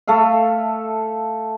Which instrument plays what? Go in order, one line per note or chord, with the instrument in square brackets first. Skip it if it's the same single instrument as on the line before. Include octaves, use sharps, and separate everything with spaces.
[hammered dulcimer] A3 A4 E5 F5